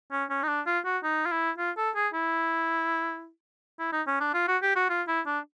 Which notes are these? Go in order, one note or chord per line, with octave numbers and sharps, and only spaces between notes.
C#4
C#4
D#4
D4
F4
F#4
D#4
F4
E4
F4
A4
G#4
E4
E4
D#4
C#4
D4
F4
F#4
G4
F#4
F4
E4
D4